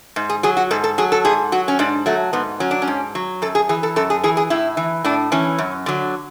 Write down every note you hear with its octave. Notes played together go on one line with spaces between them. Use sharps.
G#2
G#4
F#3 G#4
F#4
G#2 A4
A4
F#3 G#4
A4
G#2 G#4
F#3 F#4
C#4
G#2 D4
F#3 A3
G#2 B3
F#3 C#4
D4
C#4
G#2
F#3
F#2 A4
G#4
E3 G#4
A4
F#2 A4
G#4
E3 G#4
G#4
A2 E4
E3
A2 D4
E3 C#4
F#2
D3 F#3